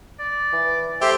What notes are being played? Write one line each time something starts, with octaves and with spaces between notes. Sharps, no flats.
D5
E3
A3 G4 C5 E5